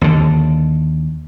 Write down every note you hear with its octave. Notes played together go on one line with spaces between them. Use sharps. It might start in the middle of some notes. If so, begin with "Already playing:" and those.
D#2 D3